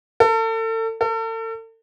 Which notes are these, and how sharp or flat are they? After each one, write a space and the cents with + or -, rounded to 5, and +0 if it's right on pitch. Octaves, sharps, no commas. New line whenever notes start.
A4 +35
A4 +40